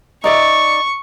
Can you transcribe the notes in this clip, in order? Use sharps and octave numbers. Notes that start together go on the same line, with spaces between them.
D#4 D5 E5 C#6